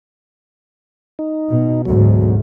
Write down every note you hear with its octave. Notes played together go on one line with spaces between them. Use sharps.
D#4
B2
D2 G#2 B2 F#3